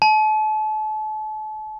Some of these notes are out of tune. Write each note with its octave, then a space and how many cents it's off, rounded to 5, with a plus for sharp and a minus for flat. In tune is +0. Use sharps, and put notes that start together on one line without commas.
A5 -35